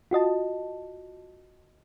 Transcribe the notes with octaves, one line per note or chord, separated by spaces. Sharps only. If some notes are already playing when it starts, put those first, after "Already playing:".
F4 F#4 D#5 A5